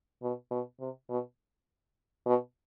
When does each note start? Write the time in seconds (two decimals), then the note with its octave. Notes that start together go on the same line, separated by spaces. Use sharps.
0.23 B2
0.51 B2
0.80 C3
1.10 B2
2.26 B2